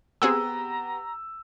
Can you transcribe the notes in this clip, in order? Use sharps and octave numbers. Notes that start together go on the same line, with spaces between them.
B3 C4 G4 G#4 F#5 A#5 E6